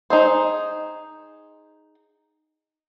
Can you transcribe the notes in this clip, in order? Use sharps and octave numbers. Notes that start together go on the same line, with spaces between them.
D#4 G#4 C5